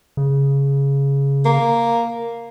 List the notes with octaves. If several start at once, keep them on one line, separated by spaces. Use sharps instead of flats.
C#3
A#3